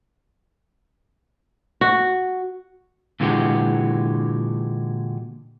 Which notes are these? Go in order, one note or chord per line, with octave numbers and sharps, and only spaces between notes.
F#4
A#2 D3 E3 G#3 F#4 G4